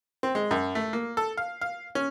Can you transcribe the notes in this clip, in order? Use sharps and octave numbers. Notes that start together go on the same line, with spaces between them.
C4
G#3
F#2
A3
A#3
A4
F5
F5
C#4